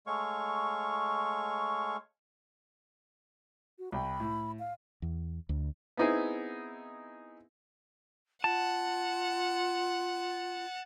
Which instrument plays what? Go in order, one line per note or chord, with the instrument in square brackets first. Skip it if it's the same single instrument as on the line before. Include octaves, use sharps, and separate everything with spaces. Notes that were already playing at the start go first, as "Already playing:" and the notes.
[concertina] G#3 A3 C#5 F5 C#6
[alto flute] F#4
[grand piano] C2 G5 [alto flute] B5
[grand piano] A2
[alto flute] F5
[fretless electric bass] E2
D2
[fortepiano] B3 C4 D#4 E4 G#4
[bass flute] F4 [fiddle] F#5 [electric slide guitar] A5